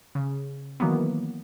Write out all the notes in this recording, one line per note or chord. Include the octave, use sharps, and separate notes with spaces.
C#3
D#3 E3 F#3 A#3 B3